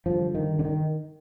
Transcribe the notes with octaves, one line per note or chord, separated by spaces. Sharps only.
G2 D3 F3
D#3
D3
D#3